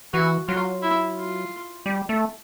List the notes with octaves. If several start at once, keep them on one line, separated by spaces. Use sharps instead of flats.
E3 F#4
F#3 F4
E4
F4
G3
A3